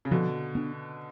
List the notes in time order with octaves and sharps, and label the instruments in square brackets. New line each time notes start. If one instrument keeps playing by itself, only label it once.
[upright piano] C#3
[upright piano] B2 D3 [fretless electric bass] F3
[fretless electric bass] B3 D4